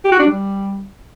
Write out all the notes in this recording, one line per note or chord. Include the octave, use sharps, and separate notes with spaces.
G4
F#4
D4
G3